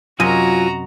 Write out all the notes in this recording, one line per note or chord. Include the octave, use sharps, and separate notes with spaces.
F#2 C3 F#3 F4 F#4 D#5 G#5 A#5